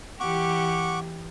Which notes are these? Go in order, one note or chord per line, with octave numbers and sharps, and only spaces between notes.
E3 G4 F#5 C#6 D6